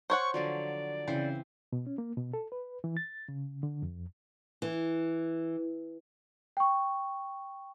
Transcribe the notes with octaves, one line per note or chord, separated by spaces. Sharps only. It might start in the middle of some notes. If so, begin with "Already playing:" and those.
C5 C#5 F#5 C#6
D3 F3 F#3 D5
C#3 E3 C4 C5
B2
C#4
A#3
B2
A4
B4
E3
A6
C#3
D3
F2
E3
G5 C#6